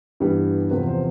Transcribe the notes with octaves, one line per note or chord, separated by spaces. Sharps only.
G2 E3 G3 B3 G4
E2 C3 F3 B3 B4
C5